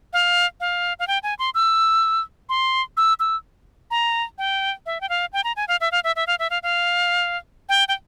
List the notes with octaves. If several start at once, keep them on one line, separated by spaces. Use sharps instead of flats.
F5
F5
F5
G5
G#5
C6
E6
C6
E6
E6
A#5
G5
E5
G5
F5
G5
A#5
G#5
F5
E5
F5
E5
E5
F5
E5
F5
F5
G5
G5